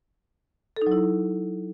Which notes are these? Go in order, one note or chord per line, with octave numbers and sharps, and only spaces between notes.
A4
D#4
F#3
E4